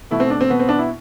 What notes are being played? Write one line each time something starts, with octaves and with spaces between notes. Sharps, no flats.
B2 A3 E4
C4
D4
C4
B2 B3
C4
D4
E4